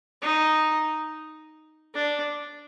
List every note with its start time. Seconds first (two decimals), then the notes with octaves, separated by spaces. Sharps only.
0.22 D#4
1.95 D4